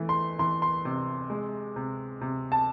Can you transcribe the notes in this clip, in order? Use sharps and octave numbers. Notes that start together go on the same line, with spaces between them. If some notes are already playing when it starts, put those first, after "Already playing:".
Already playing: E3 A3
C6
E3 C6
C6
C3
G#3
C3
C3
A5